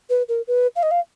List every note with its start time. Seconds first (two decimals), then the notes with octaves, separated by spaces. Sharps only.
0.10 B4
0.28 A#4
0.47 B4
0.76 F5
0.83 D#5
0.91 F5